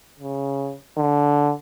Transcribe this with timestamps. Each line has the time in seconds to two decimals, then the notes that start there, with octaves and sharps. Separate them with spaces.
0.20 C#3
0.98 D3